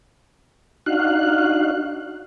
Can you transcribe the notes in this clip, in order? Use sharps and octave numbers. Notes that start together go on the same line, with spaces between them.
D4 D#4 F#4 F5 F#6